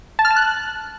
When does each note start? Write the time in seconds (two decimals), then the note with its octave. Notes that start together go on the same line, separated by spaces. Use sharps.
0.19 A5
0.25 F6
0.31 A5
0.36 F#6